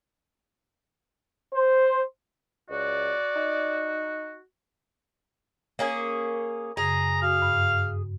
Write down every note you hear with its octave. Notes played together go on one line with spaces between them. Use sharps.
C5
C#2 F#4 D5
D#4
A#3 C#4 G#4
F#2 C#3 G#4 A#5
F#4 F5
G2